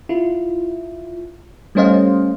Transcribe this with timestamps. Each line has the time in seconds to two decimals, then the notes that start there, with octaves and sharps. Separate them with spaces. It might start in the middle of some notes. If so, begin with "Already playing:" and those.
0.09 E4 F4
1.75 G3 A3 C#4 C5 D#5 F5